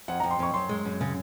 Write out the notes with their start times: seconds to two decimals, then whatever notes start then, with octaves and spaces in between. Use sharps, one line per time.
0.08 F2 F#5
0.20 F2 A#5
0.31 C6
0.39 F2 C#6
0.54 F#2 C6
0.69 G#3
0.85 F#2
1.01 C#3